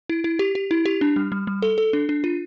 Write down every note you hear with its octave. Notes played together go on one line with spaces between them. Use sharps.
E4
E4
G4
G4
E4
G4
D4
G3
G3
G3
A4
A4
D4
D4
F4